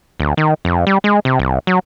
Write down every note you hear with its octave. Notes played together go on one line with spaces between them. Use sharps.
D2
D#3
F2
G3
G#3
C3
C2
F#3